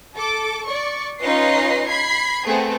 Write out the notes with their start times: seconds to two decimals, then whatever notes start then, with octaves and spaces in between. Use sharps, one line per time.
0.15 A4 D6
0.66 D5 C#6
1.22 C#4 D#4 F4 B4 D#5 C7
1.88 B5 G#6 C7
2.45 A3 B3 C4 G#4